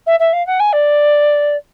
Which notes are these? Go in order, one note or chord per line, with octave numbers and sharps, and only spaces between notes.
E5
E5
F5
F#5
G#5
D5